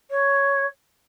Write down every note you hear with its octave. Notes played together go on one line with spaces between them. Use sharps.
C#5